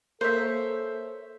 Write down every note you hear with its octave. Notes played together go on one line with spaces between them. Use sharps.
A#3 A4 C5 C#5 E5